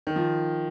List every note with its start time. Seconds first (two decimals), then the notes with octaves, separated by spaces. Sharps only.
0.07 D#3
0.16 F3